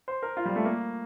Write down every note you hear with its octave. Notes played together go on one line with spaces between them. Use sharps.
C5
A#4
F4
G3
A3
A#3